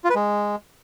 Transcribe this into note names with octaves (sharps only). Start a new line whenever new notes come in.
F4
B4
G#3